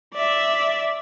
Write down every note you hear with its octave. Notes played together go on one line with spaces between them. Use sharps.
D5 E5